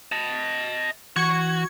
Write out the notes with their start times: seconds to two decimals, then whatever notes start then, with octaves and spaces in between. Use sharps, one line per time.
0.12 D#5 A5
1.16 E3 F#4 C#6 G#6